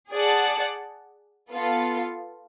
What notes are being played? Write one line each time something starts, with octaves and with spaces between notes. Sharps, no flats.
G#4 D5 F#5 A5
B3 F4 A4 F5